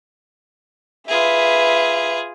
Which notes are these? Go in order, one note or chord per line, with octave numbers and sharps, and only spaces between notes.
F4 G#4 B4 E5